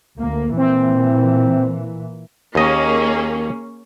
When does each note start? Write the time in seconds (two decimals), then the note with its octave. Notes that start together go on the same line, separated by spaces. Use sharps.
0.18 D2 A#3
0.57 A#2 E3 C4
2.55 D#2 A#3 C#4 G#4 D#5